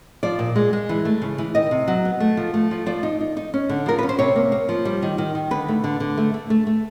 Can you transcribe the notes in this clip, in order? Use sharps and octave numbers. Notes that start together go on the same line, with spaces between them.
F3 D5
A#2
G#3
G#3
E3
A3
C#3
E3
D#3 D#5
C3
F#3
B3
A3
F3
A3
F3
F3 D5
D#4
D#4
D#4
C#4
D3
F3 A#4
C#4 B4
C5
C3 C#5
A#3
A#3
F3
G3
D#3
D#3
D#3
D3 B4
A3
D3
D3
A3
A3
A3
A3